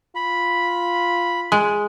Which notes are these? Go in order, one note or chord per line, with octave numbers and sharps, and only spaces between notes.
F4 B5
G#3